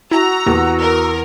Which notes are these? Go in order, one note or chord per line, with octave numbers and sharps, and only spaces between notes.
E4 F#4 A#5 E6
E2 A#3 G4 A4
A#4